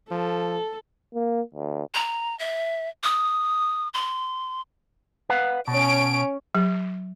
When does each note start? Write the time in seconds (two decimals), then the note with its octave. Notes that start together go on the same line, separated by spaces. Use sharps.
0.11 F3 A4
1.14 A#3
1.54 D2
1.95 A#5
2.39 E5
3.04 D#6
3.94 C6
5.29 B4 F5 F#5
5.68 B2 C#4 D7
6.55 F#3